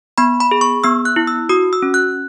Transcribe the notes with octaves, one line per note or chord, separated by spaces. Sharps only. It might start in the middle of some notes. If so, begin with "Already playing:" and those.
B3 B5
B5
G#4
C#6
B3 E6
F#6
E4
E6
F#4 D#6
E6
C#4
F#6